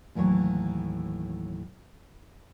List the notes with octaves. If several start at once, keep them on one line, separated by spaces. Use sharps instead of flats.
D#2 A2 E3 F#3 C#5